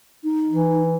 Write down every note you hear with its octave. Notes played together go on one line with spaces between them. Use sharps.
D#4
E3